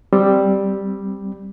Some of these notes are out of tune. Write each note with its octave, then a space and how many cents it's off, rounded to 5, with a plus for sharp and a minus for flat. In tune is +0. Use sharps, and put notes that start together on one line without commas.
G3 +0 C4 +0